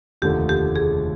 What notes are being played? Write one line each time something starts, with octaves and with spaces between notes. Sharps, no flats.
F1 D#2 D3 F3 A3 G4
G4
G#4